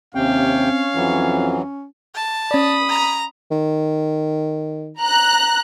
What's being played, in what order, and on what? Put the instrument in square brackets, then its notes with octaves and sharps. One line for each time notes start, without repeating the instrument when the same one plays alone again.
[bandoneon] D#2 C3 G5 [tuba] C4 [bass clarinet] C#4 [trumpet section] C#5 F5
[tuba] F2 [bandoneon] E3 F#3
[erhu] A5
[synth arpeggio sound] C#4 D5 [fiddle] B5 D#6
[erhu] A#5
[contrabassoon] D#3
[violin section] A#5 F#6